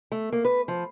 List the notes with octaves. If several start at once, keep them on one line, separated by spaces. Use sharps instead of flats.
A3
A#3
B4
F3